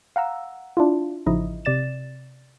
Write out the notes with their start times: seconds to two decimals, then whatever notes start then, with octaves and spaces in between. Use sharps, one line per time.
0.16 F5 F#5 A#5 E6
0.77 D4 E4 F4
1.26 A1 C#3 F3 D#4 E4 D#5
1.65 C3 D5 A6 E7